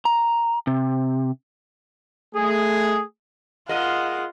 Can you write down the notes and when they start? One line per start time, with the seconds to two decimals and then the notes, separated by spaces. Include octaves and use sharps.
0.05 A#5
0.67 C3
2.36 A3 G#4
3.69 G#3 F4 A#4 D#5 F#5